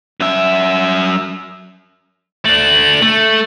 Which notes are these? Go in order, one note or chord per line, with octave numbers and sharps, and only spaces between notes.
F#2 E5
A3 D4 F#7
A3